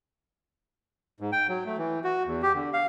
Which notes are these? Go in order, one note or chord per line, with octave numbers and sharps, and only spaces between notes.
G#2
G5
F#3
A3
E3
F#4
E2
G4
D3
F5